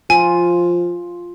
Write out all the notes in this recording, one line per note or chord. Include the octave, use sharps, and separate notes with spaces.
F3 F4 G#5